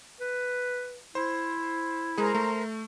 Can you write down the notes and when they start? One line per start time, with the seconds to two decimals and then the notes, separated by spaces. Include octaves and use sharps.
0.20 B4
1.15 E4 C5
2.18 G#3 G#4 A#4 C5 A#5
2.35 A3